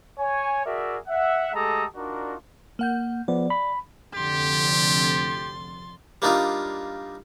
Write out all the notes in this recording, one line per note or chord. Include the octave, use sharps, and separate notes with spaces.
C#5 G#5
F#4 G#4 A#4 D5 E5
E5 F#5
G#3 A3 G4 A4 A#5 D#6
D4 D#4 F4 F#4 A#4 D5
A#3 F#5 G6
F3 B3 D5
B5
F1 F2 D3 G4 C6 A6
G3 A#3 D4 D#4 F4